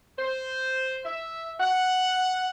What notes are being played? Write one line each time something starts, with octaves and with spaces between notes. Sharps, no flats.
C5
E5
F#5